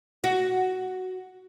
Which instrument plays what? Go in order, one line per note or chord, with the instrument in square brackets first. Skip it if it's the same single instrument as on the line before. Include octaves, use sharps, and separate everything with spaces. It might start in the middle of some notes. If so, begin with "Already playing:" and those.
[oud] F#4